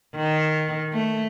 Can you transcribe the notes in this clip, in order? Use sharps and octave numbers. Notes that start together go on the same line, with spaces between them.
D#3
A3